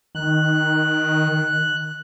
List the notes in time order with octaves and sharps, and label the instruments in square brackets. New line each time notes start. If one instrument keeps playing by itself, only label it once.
[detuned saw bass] D#3 [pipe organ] F#6